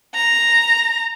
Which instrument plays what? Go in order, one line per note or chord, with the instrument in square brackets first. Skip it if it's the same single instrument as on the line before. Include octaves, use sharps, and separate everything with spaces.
[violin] A#5